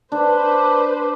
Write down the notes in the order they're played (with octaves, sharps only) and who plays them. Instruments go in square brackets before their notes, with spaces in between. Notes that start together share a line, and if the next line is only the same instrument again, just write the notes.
[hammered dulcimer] D4 [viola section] B4 C5